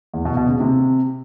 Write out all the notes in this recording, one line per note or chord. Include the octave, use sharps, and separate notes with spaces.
E2
B2
B2
C#3
C3